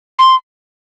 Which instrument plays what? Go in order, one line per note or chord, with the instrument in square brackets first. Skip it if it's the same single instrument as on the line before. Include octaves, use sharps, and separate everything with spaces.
[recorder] C6